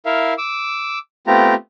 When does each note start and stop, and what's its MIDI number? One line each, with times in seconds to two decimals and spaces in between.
0.06 0.34 64
0.06 0.34 70
0.06 0.34 76
0.06 0.34 77
0.38 0.99 86
0.38 0.99 88
1.27 1.55 57
1.27 1.55 59
1.27 1.55 60
1.27 1.55 65
1.27 1.55 67
1.27 1.55 82